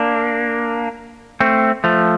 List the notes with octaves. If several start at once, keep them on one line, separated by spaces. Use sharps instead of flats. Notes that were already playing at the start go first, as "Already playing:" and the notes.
Already playing: A#3 D4
A3 C4
F3 A3